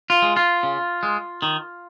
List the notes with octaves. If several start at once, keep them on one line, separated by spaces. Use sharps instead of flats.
F4
G#3
F4
C#3
G#3
D#3